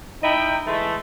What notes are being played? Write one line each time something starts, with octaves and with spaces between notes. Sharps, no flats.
D#4 E4 D#5 G5
E3 G#3 A3